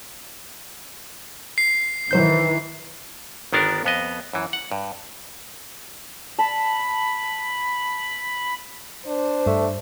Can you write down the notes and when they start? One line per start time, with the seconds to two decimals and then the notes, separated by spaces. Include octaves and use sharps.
1.58 C7
2.11 D#3 E3 F#3 C5 G6
3.52 G1 D#3 B3 D4 A#4
3.84 F2 B3 D#5
4.33 F#2 E3
4.53 F#5
4.72 G2
6.39 A5 B5
9.07 D4 C5
9.46 G2 A3